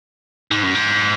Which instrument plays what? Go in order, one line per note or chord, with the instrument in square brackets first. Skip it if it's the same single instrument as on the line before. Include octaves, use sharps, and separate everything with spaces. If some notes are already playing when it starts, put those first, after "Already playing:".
[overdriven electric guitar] G#2
F#2
G#2